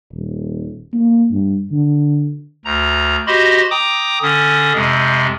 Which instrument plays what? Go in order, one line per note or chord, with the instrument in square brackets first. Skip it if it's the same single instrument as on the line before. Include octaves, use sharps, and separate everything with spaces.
[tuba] D#1
A#3
G2
D3
[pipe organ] D2 A#5
F#4 G4 C5 D#5 B5 C6
G5 A#5 D6 D#6
D3 C#4 D#6
F2 C3 G#3